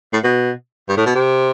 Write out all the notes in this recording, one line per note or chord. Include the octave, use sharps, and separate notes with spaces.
A2
B2
G2
A2
B2
C3